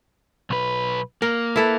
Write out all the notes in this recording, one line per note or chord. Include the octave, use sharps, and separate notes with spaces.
B1 B4
A#3 A#4
E4 A4 B4